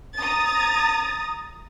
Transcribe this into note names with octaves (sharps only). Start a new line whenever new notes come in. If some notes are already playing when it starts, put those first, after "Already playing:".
A#5 D#6 A6